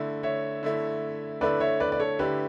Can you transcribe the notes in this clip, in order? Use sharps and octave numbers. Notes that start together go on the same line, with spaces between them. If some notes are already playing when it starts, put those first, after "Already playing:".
Already playing: D3 A3 E4
C#5 E5
D3 A3 E4
D3 A3 E4 B4 D5
C#5 E5
B4 D5
D5
A4 C#5
D3 A3 E4 G4 B4